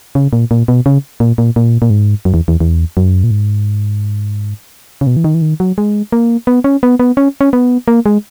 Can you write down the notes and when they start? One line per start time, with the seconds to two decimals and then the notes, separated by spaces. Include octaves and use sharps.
0.15 C#3
0.33 A#2
0.51 A#2
0.68 B2
0.86 C#3
1.20 A#2
1.38 A#2
1.56 A#2
1.82 A#2
1.90 G#2
2.25 F#2
2.34 E2
2.48 E2
2.60 E2
2.97 F#2
3.24 A#2
3.31 G#2
5.01 C#3
5.07 B2
5.17 E3
5.24 D#3
5.34 E3
5.42 D#3
5.60 F#3
5.78 G#3
6.12 A#3
6.47 B3
6.64 C#4
6.83 B3
7.00 B3
7.17 C#4
7.41 C#4
7.53 B3
7.88 A#3
8.06 G#3